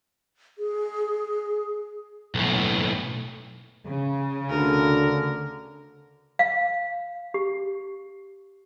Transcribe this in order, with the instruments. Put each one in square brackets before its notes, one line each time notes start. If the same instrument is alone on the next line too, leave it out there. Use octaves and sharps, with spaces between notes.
[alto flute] G#4
[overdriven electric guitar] B1 A2
[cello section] C#3
[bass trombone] D2 [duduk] D3 [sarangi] A#4
[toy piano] F5
G4